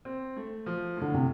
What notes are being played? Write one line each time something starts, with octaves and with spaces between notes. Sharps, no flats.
C4
A3
F3
A2 D3
C3